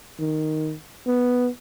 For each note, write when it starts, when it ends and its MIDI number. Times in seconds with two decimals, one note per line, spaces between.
0.20 0.74 51
1.07 1.48 59